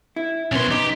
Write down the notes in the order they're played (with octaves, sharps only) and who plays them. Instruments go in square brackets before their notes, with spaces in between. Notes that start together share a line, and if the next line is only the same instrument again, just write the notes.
[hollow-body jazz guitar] E4
[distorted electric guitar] B1 C6 [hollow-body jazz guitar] B3 C#4
[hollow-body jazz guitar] D#4 [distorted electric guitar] G4